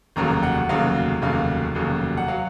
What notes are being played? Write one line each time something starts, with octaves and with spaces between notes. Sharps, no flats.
F1 D#2 C#3 F#3 A#5
F#5
F1 D#2 C#3 F#3 F5
F1 D#2 C#3 F#3 F5
F1 D#2 C#3 F#3
F#5
F#3 F5